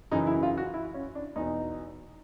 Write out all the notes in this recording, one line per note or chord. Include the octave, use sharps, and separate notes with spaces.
F#2 C#3 E3 D#4
E4
F4
F#4
E4
C#4
D4
E2 B2 D#4